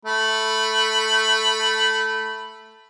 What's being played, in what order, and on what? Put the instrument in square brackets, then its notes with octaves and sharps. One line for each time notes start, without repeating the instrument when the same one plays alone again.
[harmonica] A3 B5